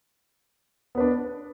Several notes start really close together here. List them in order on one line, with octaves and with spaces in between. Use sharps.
B3 B4 D4